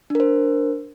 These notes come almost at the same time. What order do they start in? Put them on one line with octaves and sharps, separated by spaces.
D4 A#4 C5